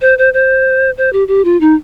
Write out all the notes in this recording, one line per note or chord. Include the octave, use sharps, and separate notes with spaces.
C5
C5
C5
C5
G4
G4
F4
D#4